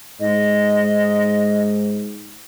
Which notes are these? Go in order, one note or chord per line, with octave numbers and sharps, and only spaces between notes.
G#2 D#5